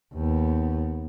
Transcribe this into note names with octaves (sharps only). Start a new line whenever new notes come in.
D#2 B3